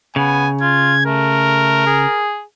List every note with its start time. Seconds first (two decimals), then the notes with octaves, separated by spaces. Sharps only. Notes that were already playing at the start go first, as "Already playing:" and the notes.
0.16 C#3 B3 G#5
0.61 F4 G#6
1.06 A3 A#4
1.86 G#4